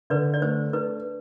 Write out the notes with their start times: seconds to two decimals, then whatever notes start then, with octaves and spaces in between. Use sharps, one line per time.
0.10 D3 B4 D5
0.34 D5
0.42 A3 C5
0.73 D4 B4